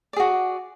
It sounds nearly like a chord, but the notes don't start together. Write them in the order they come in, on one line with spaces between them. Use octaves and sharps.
D5 G#4 F#4